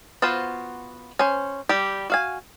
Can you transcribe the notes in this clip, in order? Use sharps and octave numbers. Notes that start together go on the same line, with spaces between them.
B3 F4 F#4 C5
C#4 C5
G3 G4
F#4 F5 G#5